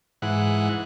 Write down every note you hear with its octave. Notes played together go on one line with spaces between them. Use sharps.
G#2 E3 F#5